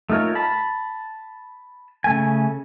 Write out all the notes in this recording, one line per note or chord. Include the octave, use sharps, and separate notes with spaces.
A3 D#4 F4 A#4 C#5
A5 B5
C#3 A3 G#5